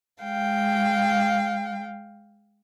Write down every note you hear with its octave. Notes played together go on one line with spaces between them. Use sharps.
G#3 F5 G5